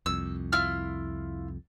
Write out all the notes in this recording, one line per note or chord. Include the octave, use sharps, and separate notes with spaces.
C2 F2 E6
E4 F4 F6